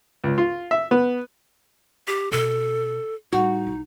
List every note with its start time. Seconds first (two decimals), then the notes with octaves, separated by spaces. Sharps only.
0.24 C#2
0.38 F4
0.71 E5
0.91 B3
2.07 G4
2.32 B2 C#4 A4
3.33 A2 G3 D#4 F#4
3.67 B1